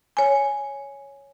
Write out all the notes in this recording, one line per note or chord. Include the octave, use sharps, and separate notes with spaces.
C#5 G#5